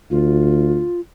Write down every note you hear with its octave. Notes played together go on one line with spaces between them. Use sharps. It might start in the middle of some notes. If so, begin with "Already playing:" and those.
D2 F4